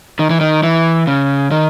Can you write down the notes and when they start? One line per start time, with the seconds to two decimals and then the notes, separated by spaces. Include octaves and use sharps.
0.19 D#3
0.30 E3
0.40 D#3
0.63 E3
1.07 C#3
1.51 D#3